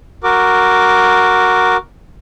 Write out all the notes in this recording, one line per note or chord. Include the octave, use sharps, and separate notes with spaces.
F#4 A#4 D6